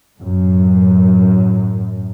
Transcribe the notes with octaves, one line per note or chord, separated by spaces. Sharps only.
F#2 A2